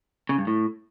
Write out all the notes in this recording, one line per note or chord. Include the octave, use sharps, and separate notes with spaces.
C#3
G2
A2